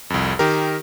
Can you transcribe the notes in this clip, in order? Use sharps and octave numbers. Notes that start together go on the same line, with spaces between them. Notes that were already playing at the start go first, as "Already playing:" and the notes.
C2 F2
D#3 G4 A#4